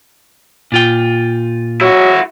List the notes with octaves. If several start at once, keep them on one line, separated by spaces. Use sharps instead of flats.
A#2 F4 G5
F#3 E4 F#4